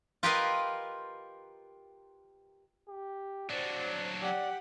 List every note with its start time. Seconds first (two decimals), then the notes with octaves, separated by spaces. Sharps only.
0.23 F4 G4 A#4 B4 D#5 F5
2.89 G4
3.50 F#3 D4 C5 D5
4.21 G4 D5 F#5